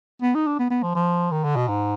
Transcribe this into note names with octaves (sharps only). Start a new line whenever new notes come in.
B3
D#4
D4
B3
B3
F3
F3
D#3
D3
B2
G#2